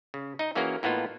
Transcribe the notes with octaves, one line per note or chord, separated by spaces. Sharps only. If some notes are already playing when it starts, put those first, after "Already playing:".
C#3
D#4 D#5
E3 A#3 C#4 F#4 G#4 A#4
A2 A#3 B3 D#4 F4